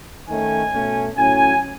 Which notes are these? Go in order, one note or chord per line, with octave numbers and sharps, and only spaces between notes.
D#3 A3 C#4 G#5
B2 A3 C#4
A2 F#3 C#4 G#5